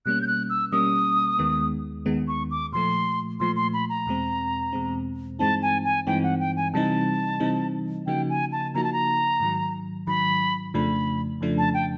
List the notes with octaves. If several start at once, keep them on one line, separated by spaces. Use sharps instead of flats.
B2 G3 A#3 C#4 F#6
G6
F#6
E6
B2 G3 A#3 C#4 D#6
D#2 D#3 G#3 B3
D#2 D#3 G#3 B3
C#6
D6
A#2 F3 A3 C6
A#2 F3 A3 C6
C6
B5
A#5
E2 B2 G#3 C4
E2 B2 G#3 C4
G2 E3 G#3 C4 D#4 A5
G#5
G#5
G2 E3 G#3 C4 D#4 G5
F#5
G5
G#5
C3 E3 G3 C4 D#4 A5
C3 E3 G3 C4 D#4
C#3 F3 A#3 D#4 F#4 G5
G#5
A5
C#3 F3 A#3 D#4 F#4 A#5
A5
A#5
G#2 D#3 F#3
G#2 D#3 F#3 B5
F2 C#3 F3 A3 D4 B5
F2 C#3 F3 A3 D4
A5
G5